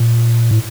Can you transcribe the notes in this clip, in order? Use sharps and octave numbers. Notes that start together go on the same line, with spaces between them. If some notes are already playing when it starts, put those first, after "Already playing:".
Already playing: A#2
A2